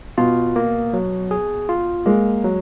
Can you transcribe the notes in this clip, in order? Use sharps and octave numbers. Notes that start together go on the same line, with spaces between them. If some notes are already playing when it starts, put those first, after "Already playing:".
B2 F4
A#3
F#3
G#4
F4
G#3 A#3
F#3